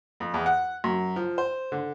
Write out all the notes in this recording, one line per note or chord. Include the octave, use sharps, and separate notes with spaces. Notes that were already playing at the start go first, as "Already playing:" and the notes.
F2
E2
F#5
F#2
F3
C5
D3